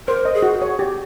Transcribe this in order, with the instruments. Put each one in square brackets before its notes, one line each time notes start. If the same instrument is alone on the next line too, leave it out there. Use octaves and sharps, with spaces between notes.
[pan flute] A#4 [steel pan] C5
[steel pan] D#5
[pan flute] G#4
[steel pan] F#4
C#5
G4